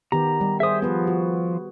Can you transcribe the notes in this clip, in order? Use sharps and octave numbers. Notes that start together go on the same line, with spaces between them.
D#3 B3 G4 A#5
G3
G#4 C5 E5 D#6
F3 B3 B4
F#4